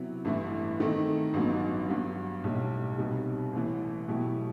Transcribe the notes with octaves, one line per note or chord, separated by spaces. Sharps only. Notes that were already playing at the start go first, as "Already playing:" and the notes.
Already playing: C3 F#3 B3 E4
A1 G2 E3 A3 E4
D#3 A3 C4 D#4 A4
A1 G2 F#3 B3 D#4
G2 F#3 B3
B1 A2 G3
C2 B2 G3 B3 D#4
A1 A2 E3
B2 F#3 A3 E4 G4